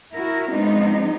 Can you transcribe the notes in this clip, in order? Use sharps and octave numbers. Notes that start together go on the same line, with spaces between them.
E4 F#4 A#4
F3 G#3 B3 C4 D4 D#4